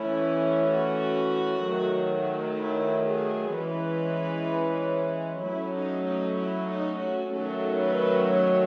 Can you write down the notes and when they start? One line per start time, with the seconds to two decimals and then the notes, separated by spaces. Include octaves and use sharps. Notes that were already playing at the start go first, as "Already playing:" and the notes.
Already playing: E3 A3 C#4 E4
0.68 F#4
1.63 D#3 F#3 A3
2.58 E4
3.06 G#4
3.53 E3 G#3 C#4 B4
5.43 F#3 A3 C#4 E4
5.75 D#4
6.06 D#4
6.38 E4
6.70 D#4
7.01 F#4
7.32 D#3 F#3 A3 C#4 A4
7.80 B4
8.28 C#5